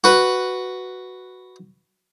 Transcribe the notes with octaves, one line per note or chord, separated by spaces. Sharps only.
F#4 B4